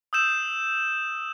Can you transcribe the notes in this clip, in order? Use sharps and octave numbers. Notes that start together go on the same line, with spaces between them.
D#6 E6 G6 E7